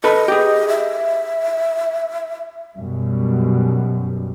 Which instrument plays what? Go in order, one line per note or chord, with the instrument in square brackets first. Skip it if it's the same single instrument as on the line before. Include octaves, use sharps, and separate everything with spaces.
[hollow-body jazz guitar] A4 B4 B5 [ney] D#5
[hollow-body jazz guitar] G4 G#4
[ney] E5
[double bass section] F#2 B2 G3